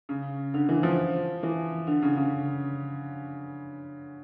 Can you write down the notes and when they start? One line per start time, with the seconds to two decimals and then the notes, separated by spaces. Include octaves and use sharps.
0.09 C#3
0.54 D3
0.69 E3
0.83 F3
1.43 E3
1.87 D3
2.02 C#3
2.17 C#3